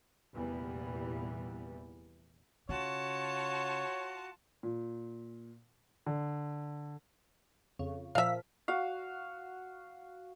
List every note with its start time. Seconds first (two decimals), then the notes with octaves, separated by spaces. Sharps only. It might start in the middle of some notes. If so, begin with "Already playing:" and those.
0.34 F1 E2 A#2 E3 G3 B3
2.69 C#3 F4 F#4 C#5 A5
4.63 A#2
6.06 D3
7.79 F2 C#3
8.15 A#2 F3 E5 F5 B6
8.68 F#4 F5